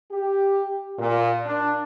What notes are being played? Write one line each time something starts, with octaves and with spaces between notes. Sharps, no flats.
G4
A#2
D4